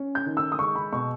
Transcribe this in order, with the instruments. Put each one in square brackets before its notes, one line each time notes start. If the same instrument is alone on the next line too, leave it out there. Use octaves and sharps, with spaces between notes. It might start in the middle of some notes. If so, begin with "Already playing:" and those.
Already playing: [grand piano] C#4
[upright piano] G6
[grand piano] D#3
[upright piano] E6
D#6
[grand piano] G#3 [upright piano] C#6
[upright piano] B5
[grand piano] B2 [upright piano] C#6